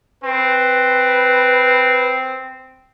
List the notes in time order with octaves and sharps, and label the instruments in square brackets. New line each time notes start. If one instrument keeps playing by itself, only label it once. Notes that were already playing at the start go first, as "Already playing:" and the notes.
[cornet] C4 [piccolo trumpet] B4